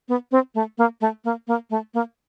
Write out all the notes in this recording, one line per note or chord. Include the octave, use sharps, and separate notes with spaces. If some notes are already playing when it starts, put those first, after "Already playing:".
B3
C4
A3
A#3
A3
A#3
A#3
A3
A#3